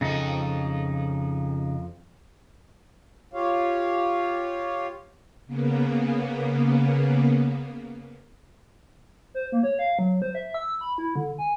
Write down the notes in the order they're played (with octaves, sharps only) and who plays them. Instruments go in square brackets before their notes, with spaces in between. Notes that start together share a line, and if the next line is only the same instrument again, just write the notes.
[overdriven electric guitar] F2 A4 [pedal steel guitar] C#3 D#4
[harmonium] F4 G4 C#5 F5
[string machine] C#3 A#3 B3
[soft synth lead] C5
A#3
C#5
F5
F#3
C5
E5
E6
B5
E4
D3
G#5